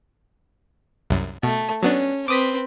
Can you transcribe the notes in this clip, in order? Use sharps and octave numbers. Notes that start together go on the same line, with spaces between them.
C2 F#2
B2 A3
F#3 B3 C#4 D4
C4 B4 D6 D#6 B6